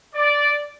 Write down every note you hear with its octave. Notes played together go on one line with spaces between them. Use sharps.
D5